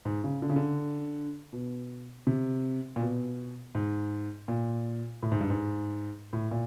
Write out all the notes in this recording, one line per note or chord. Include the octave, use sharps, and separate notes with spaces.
G#2
C#3
D3
C#3
D3
B2
C3
A#2
B2
G#2
A#2
A2
G#2
G2
G#2
A2
A#2